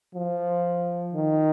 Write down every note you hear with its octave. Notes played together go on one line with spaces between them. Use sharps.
F3
D#3